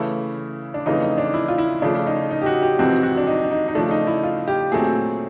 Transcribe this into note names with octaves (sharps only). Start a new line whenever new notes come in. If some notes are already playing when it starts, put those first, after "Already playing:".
Already playing: C#3 E3 A3 E4
D4
F2 C#3 E3 A3 D#4
D#4
D4
E4
F4
E4
C#3 F3 A3 D4
D#4
D#4
G4
F#4
G4
F2 C3 E3 G#3 C4 F#4
F#4
D4
D#4
D4
D#4
D#4
C#3 F3 A3 D4
D#4
E4
F4
G4
A#2 F#3 A3 C4 G#4